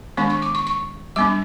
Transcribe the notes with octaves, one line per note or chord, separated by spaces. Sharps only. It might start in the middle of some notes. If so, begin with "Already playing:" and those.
D#3 G#3 B3 D4 C#6
C#6
D6
C#6
C#6
G3 B3 D4 D6